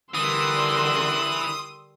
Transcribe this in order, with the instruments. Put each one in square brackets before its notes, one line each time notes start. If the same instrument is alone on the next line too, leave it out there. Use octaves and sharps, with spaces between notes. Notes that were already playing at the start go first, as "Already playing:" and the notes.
[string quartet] D3 G3 A#4 [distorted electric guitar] E3 [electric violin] C6 E6 [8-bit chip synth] D#6